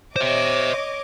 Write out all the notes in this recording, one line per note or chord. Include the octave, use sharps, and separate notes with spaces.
C5 C#5 D#5 E5 D6